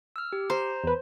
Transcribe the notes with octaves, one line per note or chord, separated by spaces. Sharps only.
E6 F6
G4
C5 A#5
E2 B4